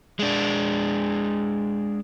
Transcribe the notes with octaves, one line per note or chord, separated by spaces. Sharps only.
G#3 D4